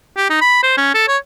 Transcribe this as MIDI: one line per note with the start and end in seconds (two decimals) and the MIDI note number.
0.16 0.28 67
0.29 0.40 63
0.41 0.59 83
0.63 0.73 72
0.77 0.92 61
0.94 1.07 69
1.08 1.17 73